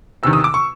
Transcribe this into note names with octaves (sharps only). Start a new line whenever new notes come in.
E2 C3 D#3 E6
D#6
D6
C#6